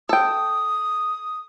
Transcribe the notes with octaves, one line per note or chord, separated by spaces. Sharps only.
A4 G5 D#6